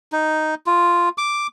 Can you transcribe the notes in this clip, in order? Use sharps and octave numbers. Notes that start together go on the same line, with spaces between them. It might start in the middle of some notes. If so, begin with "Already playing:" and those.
D#4
F4
D6